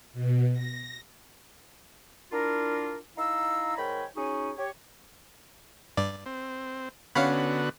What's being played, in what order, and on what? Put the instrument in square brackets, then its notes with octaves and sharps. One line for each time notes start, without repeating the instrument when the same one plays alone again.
[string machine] B2
A#6
[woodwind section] D4 E4 F4 A#4
D#4 E4 F5 A#5 E6
G#2 A#4 C#5 G5 B5
C#4 D#4 F#4 G#4 G#5
G4 C#5
[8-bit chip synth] G2 D5
[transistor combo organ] C4
[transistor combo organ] D3 B3 F#4 [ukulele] C#4 C#5 [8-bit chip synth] F5 F#5 B5